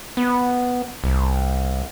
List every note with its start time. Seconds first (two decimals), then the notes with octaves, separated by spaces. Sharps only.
0.17 B3
1.04 C2